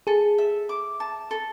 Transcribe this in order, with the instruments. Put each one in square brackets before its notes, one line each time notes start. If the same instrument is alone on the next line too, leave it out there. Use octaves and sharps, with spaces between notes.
[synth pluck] G#4 [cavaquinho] A4
[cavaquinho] E5
D6
A5
A4